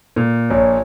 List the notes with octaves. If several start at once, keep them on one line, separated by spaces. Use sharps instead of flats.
A#2
A#1 C#5